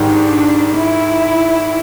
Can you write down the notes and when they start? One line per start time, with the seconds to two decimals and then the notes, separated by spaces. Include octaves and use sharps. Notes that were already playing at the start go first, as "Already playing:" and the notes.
Already playing: G#2 D#3 G3
0.10 D4
0.75 E4